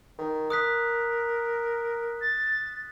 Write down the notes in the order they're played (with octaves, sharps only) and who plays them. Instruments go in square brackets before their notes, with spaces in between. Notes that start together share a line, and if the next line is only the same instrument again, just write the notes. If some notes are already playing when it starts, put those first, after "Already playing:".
[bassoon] D#3
[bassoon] A#4 [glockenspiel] D#6 F#6 B6
[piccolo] A6